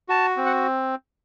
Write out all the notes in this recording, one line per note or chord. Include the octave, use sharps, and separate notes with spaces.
F#4 A5
C4
F#5